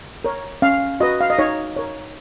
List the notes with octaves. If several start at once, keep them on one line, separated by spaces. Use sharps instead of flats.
A#4 C#5
C#4 F5
F#4 B4 D#5
F5
D#5
D#4 C#5
A#4 C#5